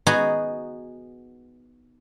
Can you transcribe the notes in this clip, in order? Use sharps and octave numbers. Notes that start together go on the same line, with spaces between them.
B3 D#4 F#4 G#4